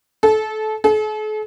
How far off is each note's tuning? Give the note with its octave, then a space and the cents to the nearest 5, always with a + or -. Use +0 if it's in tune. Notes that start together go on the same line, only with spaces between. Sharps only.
A4 -25
A4 -45